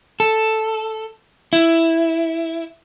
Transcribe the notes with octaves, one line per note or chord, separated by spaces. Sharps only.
A4
E4